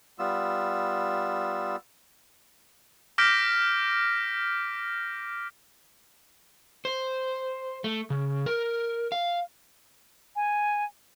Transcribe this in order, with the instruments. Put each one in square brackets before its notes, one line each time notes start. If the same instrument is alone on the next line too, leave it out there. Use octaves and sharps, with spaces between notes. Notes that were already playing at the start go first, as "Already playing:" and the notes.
[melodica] G3 B3 F4 E6
[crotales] D6 F6 G6 A#6 B6 D7
[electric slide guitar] C5
A3
C#3
A#4
F5
[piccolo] G#5